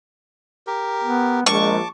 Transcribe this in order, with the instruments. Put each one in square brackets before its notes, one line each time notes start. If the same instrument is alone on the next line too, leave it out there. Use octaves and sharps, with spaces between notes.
[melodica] G4 A#4
[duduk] B3
[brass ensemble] A#1 D#3 [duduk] G#3 [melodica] A5 D6 [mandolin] C#6